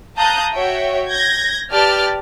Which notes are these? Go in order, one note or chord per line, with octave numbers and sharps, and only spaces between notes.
F5 A5 A#5 D#6 F#6 G6
F#4 C#5 E5 G5
G6 G#6 A#6
G4 B4 D5 G5 A5 F6